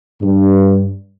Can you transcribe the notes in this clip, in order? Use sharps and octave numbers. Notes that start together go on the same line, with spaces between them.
G2